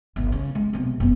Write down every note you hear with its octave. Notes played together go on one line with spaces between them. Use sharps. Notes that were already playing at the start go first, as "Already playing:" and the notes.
G1 C2
C#3
G#3
B1 C3
F#1 B3